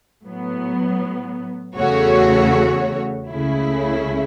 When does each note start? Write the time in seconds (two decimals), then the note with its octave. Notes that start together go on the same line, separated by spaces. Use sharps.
0.24 A2 F#3 B3
1.77 E2 C#3 A3 F#4 C#5
3.31 C#2 C#3 A3 E4